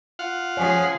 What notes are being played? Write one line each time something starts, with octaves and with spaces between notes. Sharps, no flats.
F4 F5 F#5
F3 C#4 G#4 C#5